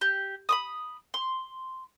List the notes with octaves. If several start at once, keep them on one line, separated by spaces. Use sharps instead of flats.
G4
B5 C#6 D#6
C6